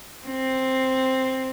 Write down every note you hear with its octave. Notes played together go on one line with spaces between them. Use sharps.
C4